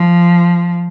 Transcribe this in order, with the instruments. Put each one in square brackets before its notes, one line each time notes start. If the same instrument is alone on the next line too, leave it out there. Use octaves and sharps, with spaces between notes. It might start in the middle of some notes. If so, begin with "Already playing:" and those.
Already playing: [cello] F3